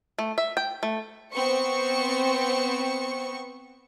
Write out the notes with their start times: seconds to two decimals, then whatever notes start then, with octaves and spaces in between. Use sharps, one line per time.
0.19 A3
0.38 E5
0.57 G5
0.83 A3
1.34 B3 C4 C5 C#6 C#7